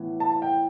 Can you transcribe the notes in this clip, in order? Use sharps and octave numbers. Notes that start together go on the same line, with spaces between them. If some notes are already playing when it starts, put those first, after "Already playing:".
Already playing: A2 E3 B3
A5
G5